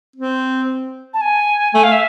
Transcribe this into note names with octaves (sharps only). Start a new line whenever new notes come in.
C4
A5
G#5
A3 G#5
F5
E5